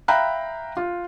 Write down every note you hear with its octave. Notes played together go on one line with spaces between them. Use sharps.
E5 F5 G5 A#5 B5 F#6
F4